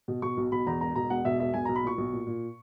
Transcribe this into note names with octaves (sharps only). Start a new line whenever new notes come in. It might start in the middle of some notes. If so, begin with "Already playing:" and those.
B2
B2 C#6
B1
B2 B5
E2 A#5
E1 A#5
B2 A#5
E1 F#5
B2 E5
E1 E5
B1 G#5
B1 A#5
B5
A#2 C#6
B1
A#2
A#2